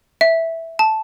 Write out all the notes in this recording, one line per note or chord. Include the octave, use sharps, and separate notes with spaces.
E5
A5